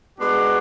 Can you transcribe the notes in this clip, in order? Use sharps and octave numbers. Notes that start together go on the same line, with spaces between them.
G#3 B3 D4 F#4